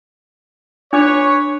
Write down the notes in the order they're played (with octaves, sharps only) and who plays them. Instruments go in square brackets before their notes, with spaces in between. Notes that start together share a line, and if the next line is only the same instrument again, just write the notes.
[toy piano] D4 D6 [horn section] B4 C#5